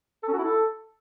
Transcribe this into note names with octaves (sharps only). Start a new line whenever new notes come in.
A4
C#4
F#4
E4
A4